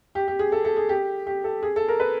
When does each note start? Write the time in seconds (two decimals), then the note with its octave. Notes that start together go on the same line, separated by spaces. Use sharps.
0.15 G4
0.28 G4
0.39 G#4
0.52 A4
0.65 A4
0.76 G#4
0.89 G4
1.27 G4
1.44 A4
1.63 G#4
1.76 A4
1.88 A#4
2.00 B4